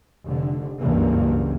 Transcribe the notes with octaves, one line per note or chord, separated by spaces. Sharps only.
F1 D3
F#1 C#2 G2 E3 A#3